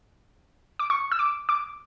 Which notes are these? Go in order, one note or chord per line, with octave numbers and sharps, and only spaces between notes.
D6
C#6
E6
D6
D6